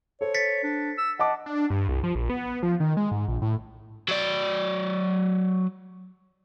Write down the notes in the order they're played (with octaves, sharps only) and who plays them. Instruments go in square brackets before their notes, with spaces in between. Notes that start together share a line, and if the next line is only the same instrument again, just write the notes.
[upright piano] A4 C5 [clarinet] C#5
[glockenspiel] A6 B6 C#7
[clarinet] D4
E6
[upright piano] D#5 A5 D6 [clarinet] F#5
[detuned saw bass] D4
G2
C2
F3
A#1
B3
F3
D#3
G#3
G#2
A#1
A2
[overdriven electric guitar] F#3 D5